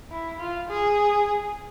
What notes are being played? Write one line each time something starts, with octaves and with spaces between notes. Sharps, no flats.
E4
F4
G#4